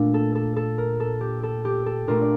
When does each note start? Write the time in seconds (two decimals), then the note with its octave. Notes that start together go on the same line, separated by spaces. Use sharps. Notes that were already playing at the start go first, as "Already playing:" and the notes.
Already playing: A#2 A3 D4
0.14 A4
0.35 A4
0.56 A4
0.78 A#4
1.00 A4
1.21 G4
1.43 A4
1.65 G4
1.86 A4
2.07 A#2 A3 D4 F4 A#4
2.22 D5